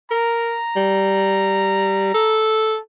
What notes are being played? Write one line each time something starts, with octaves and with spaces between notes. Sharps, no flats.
A#4 A#5
G3
A4